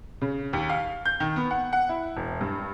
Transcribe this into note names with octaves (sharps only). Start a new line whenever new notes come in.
C#3
D#2
F5
G6
D#3
B3
F#5
F#5
E4
E1
G2